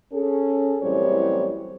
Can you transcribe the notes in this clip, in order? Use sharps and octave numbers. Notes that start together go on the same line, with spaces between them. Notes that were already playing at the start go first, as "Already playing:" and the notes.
C#4 G#4 A4
F#2 A2 E3 G3 C4 C#5